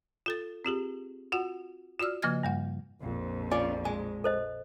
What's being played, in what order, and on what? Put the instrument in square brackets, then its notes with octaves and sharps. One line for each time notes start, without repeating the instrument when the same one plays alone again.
[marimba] F4 A4 A6
C4 F4 G4 G#4
F4 F#4 F#5
F4 F#4 D5 E6 F6
C#3 F3 A#3 D#5 F6 G#6
G2 G3 F#5
[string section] A#1 F2
[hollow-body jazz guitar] C#4 F4 [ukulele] D5 [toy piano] G#5
[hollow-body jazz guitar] G#3 [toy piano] G#5
[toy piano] A4 C5 D#5